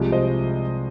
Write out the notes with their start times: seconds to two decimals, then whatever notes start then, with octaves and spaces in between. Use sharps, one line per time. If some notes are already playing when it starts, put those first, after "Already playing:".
Already playing: C2 C3 F3 G#3
0.12 C5 D#5